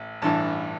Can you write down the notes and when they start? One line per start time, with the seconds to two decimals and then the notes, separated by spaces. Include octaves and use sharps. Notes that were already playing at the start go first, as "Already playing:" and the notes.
Already playing: A1
0.22 A1 G2 E3 A5